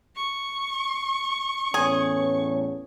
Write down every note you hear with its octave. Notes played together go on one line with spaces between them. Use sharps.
C#6
E2 A2 C#4 G#4